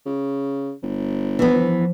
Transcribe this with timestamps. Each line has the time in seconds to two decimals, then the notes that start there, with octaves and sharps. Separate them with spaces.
0.06 C#3
0.83 G1
1.39 E3 F3 B3 E4